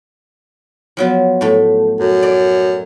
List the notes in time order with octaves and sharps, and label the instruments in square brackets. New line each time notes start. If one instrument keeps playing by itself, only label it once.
[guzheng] F3 F#3 B3
A2 A3
[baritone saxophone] F#2
[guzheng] D5